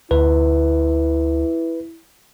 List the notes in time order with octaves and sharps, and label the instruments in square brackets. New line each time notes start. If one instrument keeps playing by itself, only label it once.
[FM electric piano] D2 [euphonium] E4 [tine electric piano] B4